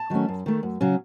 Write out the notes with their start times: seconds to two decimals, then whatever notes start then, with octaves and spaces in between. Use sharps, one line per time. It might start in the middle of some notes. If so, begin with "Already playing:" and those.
Already playing: A5
0.10 D#3 F#3 A3 C#4
0.28 F#2
0.46 D#3 A3
0.63 F#2
0.81 C#3 F#3 C#4